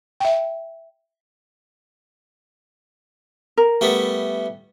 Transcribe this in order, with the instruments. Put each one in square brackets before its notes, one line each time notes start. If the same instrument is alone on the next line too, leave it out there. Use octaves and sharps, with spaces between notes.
[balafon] E5 G5
[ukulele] A#4
[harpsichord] G3 A3 B3